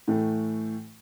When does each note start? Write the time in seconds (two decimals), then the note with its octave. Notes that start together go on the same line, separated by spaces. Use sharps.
0.08 A2 E3 A3